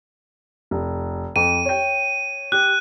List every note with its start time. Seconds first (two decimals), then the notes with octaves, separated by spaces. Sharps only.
0.71 F1
1.36 F2 D#7
1.65 C#5 G5
2.52 G4 F#6